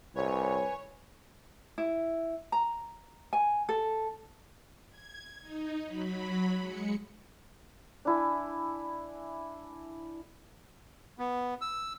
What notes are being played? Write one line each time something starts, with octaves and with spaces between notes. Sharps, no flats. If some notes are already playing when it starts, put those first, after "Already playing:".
C2 B4 C#5 G#5
E4
A#5
G#5
A4
G#6
D#4
F#3 B5
G#3 C#7
D4 E4 G#5
B3
E6